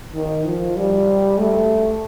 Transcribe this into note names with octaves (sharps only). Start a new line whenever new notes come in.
D#3
F3
G3
A3